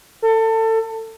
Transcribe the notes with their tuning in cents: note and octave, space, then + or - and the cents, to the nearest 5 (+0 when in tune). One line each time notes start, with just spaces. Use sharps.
A4 +25